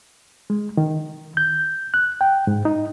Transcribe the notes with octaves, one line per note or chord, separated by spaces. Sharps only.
G#3
D#3
G6
F#6
G5
G#2
D#4